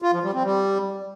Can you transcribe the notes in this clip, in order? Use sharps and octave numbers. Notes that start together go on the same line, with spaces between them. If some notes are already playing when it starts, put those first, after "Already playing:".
F4
F3
G3
C4
G3